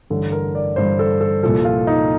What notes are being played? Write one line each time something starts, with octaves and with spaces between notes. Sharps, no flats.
A1 G2 D3 A4
A#4
D5
A1 G2 D3 C5
A4
A4
C2 A#2 F3 A4
F4
D#4